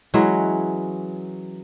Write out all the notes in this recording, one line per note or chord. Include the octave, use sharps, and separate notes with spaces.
E3 F#3 G#3 C#4